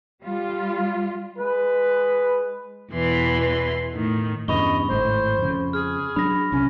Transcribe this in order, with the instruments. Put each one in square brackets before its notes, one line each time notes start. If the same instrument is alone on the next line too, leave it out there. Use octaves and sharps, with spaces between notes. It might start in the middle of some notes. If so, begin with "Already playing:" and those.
[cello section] G3 F4
[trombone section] G#3 B4
[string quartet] E2 B2 E3 B4 C6
A2 D#3
[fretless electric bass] E2 G2 C#3 [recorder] D#5 [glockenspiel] B5 C#6 G7
[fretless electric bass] G#1 A2 [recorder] C5
[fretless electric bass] F2 C#3
[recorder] G#4 [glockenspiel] F6
[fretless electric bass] F#3 D4 [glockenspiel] B5 A#6
[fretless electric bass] C2 C#3 [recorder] C#4